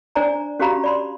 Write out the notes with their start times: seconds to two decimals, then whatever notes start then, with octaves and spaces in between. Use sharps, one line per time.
0.15 D4 C5 D5 G#5 A#5
0.59 C#4 F#4 G4 F5 A#5 B5
0.84 D5 B5 C6